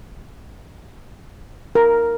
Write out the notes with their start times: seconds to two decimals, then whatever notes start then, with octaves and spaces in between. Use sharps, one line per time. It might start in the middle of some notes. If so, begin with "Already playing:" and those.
1.75 A#4